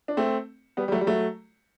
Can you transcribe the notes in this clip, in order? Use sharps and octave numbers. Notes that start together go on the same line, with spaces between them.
D4
A3 C4
G3 B3
G3
F#3 A3
G3
F#3 A3